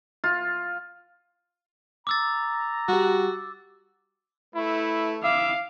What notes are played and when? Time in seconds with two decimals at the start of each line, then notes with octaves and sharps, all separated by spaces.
0.24 F4
2.07 A#5 D6 E6 A6
2.89 G3 F#4 G4
4.55 A3 E4 B4
5.23 E4 E5 F5 D6